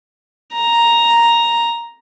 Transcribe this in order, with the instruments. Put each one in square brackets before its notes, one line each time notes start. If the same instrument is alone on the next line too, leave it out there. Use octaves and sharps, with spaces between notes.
[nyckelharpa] A#5